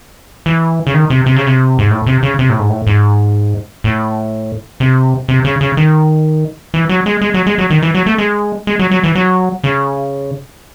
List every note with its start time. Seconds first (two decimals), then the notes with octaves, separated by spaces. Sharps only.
0.46 E3
0.87 C#3
0.94 D#3
1.10 C3
1.26 C3
1.36 C#3
1.47 C3
1.79 G#2
1.91 A2
2.07 C3
2.23 C#3
2.39 C3
2.49 A2
2.59 G#2
2.69 A2
2.87 G#2
3.84 A2
4.80 C3
5.28 C3
5.45 C#3
5.61 C#3
5.77 D#3
6.74 E3
6.89 F#3
7.06 G#3
7.21 G#3
7.34 F#3
7.47 G#3
7.58 F#3
7.70 D#3
7.83 E3
7.95 F#3
8.06 A3
8.18 G#3
8.67 G#3
8.79 F#3
8.91 F#3
9.04 E3
9.15 F#3
9.64 C#3